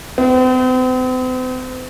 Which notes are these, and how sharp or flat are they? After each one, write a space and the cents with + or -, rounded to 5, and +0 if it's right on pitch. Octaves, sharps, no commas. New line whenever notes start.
C4 -45